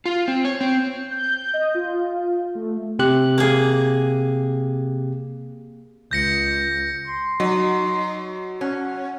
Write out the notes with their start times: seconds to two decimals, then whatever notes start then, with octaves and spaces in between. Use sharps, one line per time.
0.06 F4
0.28 C4
0.45 C#5
0.61 C4
1.11 G6
1.54 D#5
1.75 F4
2.55 A3
2.99 C3 G4 F#6
3.38 A#3 G#4
6.11 C#2 G6 A#6 C#7
7.07 C6
7.40 F#3 D#4
8.61 C#4 F#5